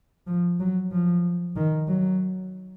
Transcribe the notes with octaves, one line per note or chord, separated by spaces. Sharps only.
F3
F#3
F3
D#3
F#3